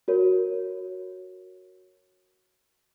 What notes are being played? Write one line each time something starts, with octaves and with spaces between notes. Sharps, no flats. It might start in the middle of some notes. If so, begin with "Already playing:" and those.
F#4 A#4 C#5